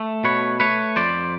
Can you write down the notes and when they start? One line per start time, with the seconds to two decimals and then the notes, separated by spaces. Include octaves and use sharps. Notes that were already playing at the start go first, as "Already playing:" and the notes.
Already playing: A3
0.24 B2 B4 C#5
0.60 A3 B4 C#5
0.96 F2 C5 D5